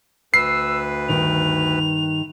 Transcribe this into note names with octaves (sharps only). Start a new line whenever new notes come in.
D2 B4 E6 C7
G2 D#3 F7